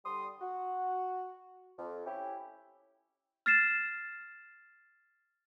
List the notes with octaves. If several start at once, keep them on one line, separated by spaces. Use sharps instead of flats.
D3 G3 C6 D#6
F#4
F2
C#4 E4 G4
F6 A6 C7 E7